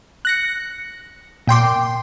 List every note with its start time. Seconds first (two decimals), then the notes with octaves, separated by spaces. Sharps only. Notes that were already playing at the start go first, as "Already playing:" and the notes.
0.25 F#6 A#6 C#7
1.47 A#2 G5 C6 D6